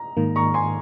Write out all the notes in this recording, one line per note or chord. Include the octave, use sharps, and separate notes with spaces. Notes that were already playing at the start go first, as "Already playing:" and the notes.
Already playing: A#5
G#2 D#3 A#3
A#5 C#6
G#5 C6